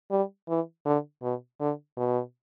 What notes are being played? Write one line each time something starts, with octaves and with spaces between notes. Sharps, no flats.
G3
E3
D3
B2
D3
B2